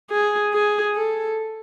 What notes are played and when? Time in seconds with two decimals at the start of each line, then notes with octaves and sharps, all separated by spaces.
0.11 G#4
0.53 G#4
0.95 A4